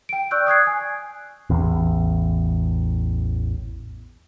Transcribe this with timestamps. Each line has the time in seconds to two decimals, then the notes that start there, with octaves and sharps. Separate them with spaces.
0.09 G5 D7
0.31 D5 C#6 E6 F#6 G6
0.47 D#6 F#6 G#6 C7
0.67 G#5
1.50 A1 E2